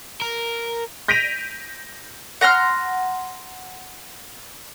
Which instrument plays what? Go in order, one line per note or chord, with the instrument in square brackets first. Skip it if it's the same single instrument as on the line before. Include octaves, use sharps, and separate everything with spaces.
[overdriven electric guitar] A#4
[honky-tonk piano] G6 A#6 B6 D7 D#7 F7
[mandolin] F#5 A#5 C6 F6